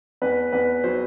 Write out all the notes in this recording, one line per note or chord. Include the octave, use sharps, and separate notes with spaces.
E2 B4
E2 B4
F#3 C5